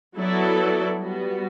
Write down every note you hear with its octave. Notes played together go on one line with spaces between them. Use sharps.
F#3 B3 E4 A4 D5
G3 B3 F#4